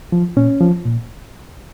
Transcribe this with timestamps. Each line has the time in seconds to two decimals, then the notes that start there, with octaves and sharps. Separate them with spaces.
0.12 F3
0.37 A#2 C#4
0.61 F3
0.86 A#2